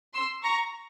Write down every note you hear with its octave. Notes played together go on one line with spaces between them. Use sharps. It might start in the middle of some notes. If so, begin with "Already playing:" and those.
C6 E6
A#5 C#6